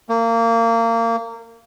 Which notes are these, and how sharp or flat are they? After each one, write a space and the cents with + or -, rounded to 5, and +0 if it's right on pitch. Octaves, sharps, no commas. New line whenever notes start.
A#3 -25